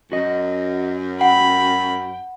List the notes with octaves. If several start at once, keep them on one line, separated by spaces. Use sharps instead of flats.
F#2 F#4 D#5
F#5 G5 B5